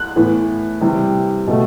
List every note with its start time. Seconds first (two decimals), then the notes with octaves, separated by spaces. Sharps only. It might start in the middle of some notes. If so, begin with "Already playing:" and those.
Already playing: F#6
0.16 A2 E3 B3
0.81 C3 E3 G3
1.48 B2 A3